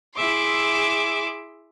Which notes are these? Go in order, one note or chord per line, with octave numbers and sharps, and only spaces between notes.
E4 G#4 E5 C6 D6